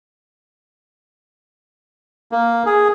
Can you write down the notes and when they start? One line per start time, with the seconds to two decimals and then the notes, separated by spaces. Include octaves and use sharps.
2.32 A#3
2.66 G#4